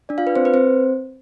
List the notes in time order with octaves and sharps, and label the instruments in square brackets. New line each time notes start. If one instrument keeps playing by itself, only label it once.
[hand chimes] D4 D5
F4 F5
B4
C4 C5
B4
C4 C5